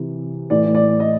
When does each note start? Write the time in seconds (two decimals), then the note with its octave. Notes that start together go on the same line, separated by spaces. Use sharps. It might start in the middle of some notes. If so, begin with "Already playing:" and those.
Already playing: C3 E3
0.50 A2 E3 D5
0.75 D5
1.00 D#5